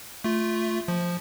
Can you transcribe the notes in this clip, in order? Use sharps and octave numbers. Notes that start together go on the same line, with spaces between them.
A3 F4
F3